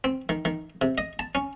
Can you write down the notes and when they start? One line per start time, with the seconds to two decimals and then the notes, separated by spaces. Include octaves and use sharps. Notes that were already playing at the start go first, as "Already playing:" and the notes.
0.04 C4
0.29 D#3
0.45 D#3
0.82 C3
0.98 D#5
1.19 A5
1.35 C#4